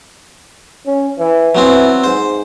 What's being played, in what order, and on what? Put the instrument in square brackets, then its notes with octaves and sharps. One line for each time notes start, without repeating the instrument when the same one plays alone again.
[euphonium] C#4
E3
[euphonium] E3 [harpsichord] F#3 B3 C4
[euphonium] G#2 [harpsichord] C5